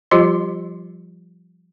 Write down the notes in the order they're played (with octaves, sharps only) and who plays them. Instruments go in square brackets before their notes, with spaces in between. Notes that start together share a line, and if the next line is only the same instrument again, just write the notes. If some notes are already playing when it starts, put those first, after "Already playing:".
[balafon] F3 G3 F4 G4 D#5 C6